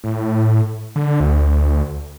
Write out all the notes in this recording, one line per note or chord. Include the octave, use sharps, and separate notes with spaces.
A2
D3
D2